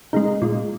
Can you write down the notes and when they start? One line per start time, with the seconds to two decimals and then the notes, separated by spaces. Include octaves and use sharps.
0.13 C#3 G#3 D#4
0.42 A#2 G#3